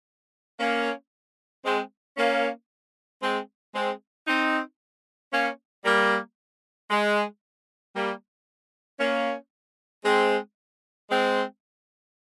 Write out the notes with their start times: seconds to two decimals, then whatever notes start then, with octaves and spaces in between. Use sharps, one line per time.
0.60 A#3 C#4
1.65 G#3 C4
2.17 A#3 C#4
3.23 G#3 C4
3.75 G#3 C4
4.28 C4 D#4
5.33 A#3 C#4
5.85 G3 A#3
6.91 G#3
7.95 G3 A#3
9.00 A#3 C#4
10.05 G#3 C4
11.10 G#3 C4